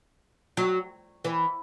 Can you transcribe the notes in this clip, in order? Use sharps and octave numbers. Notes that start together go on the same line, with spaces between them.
F#3
E3